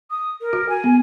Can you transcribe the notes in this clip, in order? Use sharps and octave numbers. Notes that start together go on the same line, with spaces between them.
D#6
A#4
F#4
G#5
B3